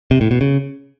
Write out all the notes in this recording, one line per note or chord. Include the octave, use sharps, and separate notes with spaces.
C3
A2
B2
C#3